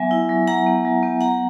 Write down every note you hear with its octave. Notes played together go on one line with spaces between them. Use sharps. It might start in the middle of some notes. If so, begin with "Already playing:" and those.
Already playing: F#3 B3 E5 G#5
E4
F#3
F#3 F#5 A#5
B3
F#3
B3
F#3 F#5 A#5